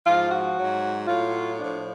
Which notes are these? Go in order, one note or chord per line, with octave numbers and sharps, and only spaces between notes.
G#2 F3 F4
F#4
G#2 F#3
A2 F#3 F4
A2 F3 D4